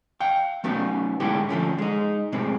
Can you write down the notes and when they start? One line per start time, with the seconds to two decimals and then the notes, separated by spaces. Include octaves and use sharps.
0.20 F5 G5
0.64 F#3 A3 B3 C#4 D#4
1.20 A2 D3 G#3 B3 E4 G4
1.49 D3 F3 A3 C#4
1.78 G#3 D#4
2.32 A2 C3 G#3 C4